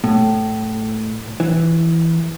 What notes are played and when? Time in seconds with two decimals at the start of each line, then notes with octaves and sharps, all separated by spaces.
0.04 A2
1.40 E3